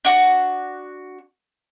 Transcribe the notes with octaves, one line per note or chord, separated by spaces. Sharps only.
D4 F#4